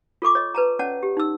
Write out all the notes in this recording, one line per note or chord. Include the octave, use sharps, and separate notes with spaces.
F4 A4 C#6 D6
C#5 D#5
B4 A5 A#5
C#4 C#5 D5 F#5 A5
G4
D#4 E6